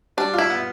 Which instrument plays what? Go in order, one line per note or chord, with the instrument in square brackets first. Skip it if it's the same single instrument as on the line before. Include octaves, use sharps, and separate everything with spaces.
[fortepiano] G3 [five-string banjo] D4
[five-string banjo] E4 [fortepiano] F4
[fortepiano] B3